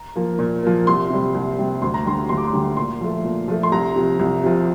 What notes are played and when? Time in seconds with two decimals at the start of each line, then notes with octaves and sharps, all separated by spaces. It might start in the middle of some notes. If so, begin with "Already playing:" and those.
Already playing: A#5
0.16 F3 A#3
0.39 A#2
0.63 F3 A#3
0.87 C2 C6
1.10 C3 G3
1.34 C2
1.59 C3 G3
1.82 D2 C6
1.94 A#5
2.05 D3 G3 C6
2.29 D2 C6
2.37 D6
2.44 C6
2.53 D3 G3
2.77 A#2 C6
3.01 F3 A3
3.25 A#2
3.48 F3 A3
3.63 C6
3.72 C2 A#5
3.96 C3 F3
4.19 C2
4.44 C3 F3